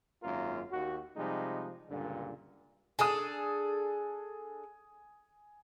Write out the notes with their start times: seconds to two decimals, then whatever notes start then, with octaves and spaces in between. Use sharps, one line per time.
0.23 G#1 F#2 A#3 F4 A#4
0.71 D#2 F#4
1.17 C3 F3 G3 G#3 D#4
1.89 C#2 G2 A#2 D3
2.99 D4 G#4 A4 G#5 D#6